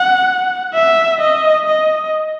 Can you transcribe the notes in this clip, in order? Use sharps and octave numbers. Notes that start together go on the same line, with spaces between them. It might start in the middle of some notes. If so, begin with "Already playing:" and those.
Already playing: F#5
E5
D#5
D#5